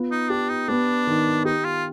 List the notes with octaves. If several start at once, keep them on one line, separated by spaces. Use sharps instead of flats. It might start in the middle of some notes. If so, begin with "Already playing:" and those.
Already playing: B3 F4
D#4
D4 G4
D#4
B3 D4
D#3
D#4 G4
F4